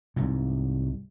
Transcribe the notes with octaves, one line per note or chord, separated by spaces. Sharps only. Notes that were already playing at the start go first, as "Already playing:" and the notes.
C2 G#2